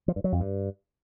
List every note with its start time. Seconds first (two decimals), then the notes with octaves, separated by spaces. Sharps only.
0.08 F3
0.16 G2
0.24 F#3
0.32 F2
0.40 G2